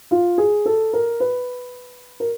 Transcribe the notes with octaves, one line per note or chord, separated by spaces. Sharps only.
F4
G#4
A4
A#4
B4
A#4